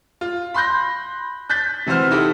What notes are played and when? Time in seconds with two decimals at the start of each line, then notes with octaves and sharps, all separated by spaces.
0.21 F4
0.54 B5 C6 F#6 G6 A#6
1.49 F#6 G6 A6 B6
1.86 C3 E3 F#4 C5 F6
2.11 D#4 E4 G4 A4